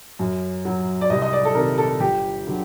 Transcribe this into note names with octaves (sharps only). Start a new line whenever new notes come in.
F#2
F#3
D5
C2 D#5
D#5
D5
A4
C3 D#3 G3 A#4
A4
G1 G4
D3 F#3